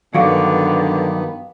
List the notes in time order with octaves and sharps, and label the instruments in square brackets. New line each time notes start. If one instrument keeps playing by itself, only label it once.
[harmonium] G2 D#3 B3 [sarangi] D3 [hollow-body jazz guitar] F#3 F#4 D5 [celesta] F5